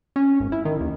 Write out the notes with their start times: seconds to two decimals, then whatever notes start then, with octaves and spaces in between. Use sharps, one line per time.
0.16 C#4
0.40 G#1
0.52 E4
0.65 D#3
0.81 D#2